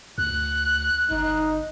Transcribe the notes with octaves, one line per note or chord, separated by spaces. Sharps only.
D2 F#6
G1 D#4